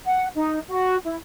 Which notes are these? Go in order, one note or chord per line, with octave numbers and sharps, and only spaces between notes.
F#5
D#4
F#4
E4